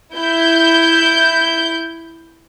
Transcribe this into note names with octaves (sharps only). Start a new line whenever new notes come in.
E4 G6